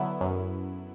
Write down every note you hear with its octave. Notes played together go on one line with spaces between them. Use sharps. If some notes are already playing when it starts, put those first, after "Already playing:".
Already playing: D3 F#3 B3 E4
F#2